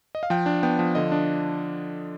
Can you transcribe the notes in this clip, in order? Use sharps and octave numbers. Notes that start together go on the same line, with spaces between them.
D#5
F5
F3 G5
D4
B3 G5
F3
D3 D#5
D4